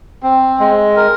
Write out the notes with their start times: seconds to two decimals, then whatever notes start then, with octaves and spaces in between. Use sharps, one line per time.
0.23 C4
0.60 G#3
0.96 A#4